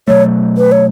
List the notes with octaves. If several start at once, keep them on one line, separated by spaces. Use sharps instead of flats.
B2 F#3 A3 C#5
B4
C#5